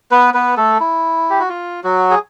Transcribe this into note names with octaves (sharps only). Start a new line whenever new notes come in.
B3 B4
B3 B4
A3 A4
E4
G4
F#4
F4
F#3 F#4
G#4